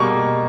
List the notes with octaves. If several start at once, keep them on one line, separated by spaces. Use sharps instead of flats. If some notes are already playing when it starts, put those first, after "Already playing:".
Already playing: B2 G3 A#3 C#6